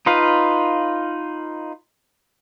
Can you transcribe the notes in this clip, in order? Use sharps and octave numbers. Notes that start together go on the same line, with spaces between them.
D#4 F4 B4 F5